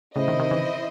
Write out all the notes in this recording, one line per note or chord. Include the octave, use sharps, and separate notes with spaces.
A2 C#3 E4 C5 D#5
C3 D#3
C3 D#3
C#3 E3